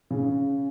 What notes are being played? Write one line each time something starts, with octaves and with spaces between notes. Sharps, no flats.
C#3